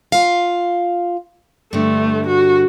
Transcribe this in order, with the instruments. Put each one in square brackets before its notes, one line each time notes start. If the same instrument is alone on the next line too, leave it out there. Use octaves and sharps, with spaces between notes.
[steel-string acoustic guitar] F4 F5
[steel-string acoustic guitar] G2 D3 [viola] A3
[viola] F#4